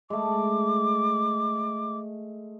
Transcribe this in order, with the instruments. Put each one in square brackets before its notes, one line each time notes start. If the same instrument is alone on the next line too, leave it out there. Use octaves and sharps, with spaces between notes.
[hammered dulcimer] G#3 A3 [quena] D6